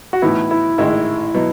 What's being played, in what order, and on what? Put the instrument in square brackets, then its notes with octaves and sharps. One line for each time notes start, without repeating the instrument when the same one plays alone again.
[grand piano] F#4
[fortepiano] A2 E3 B3 D#4 [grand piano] E4
[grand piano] E4
[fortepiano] A1 G#2 D#3 G#3 [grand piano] E4
[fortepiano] B2 F#3 B3